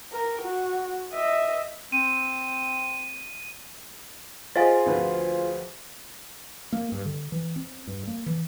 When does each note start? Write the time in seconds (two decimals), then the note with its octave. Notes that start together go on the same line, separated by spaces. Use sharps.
0.12 A#4
0.42 F#4
1.13 D#5 E5
1.92 C4 D#7
4.55 F4 G#4 C5 D#5 F5 G#5
4.86 D2 F3 B4
6.72 A#3
6.92 G2
7.05 D3
7.32 E3
7.56 C4
7.87 G2
8.07 A#3
8.26 E3